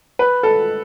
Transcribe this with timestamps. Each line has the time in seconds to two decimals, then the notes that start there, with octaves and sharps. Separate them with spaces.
0.19 B4
0.43 A4